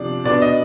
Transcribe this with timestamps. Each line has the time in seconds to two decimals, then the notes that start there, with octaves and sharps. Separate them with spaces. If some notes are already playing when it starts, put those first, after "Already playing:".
Already playing: C3 F3 D4 D5
0.24 B2 B3 D4 D5
0.42 D#5